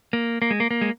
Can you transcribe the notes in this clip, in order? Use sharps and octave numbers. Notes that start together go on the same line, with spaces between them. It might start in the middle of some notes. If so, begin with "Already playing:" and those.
A#3
A#3
G#3
A#3
A#3
G#3